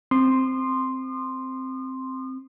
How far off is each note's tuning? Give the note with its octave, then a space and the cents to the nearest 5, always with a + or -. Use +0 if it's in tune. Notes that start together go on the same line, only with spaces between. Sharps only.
C4 +0 C6 +0 D#6 -40